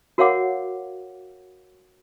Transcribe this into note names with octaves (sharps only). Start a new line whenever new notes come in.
F#4 A#4 C#5 F5 F#5 D6